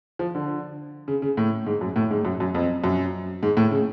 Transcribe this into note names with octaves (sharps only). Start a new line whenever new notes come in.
F3
D3
C#3
C#3
A2
G#2
F#2
A2
G#2
F#2
F#2
F2
F#2
G#2
A2
C#3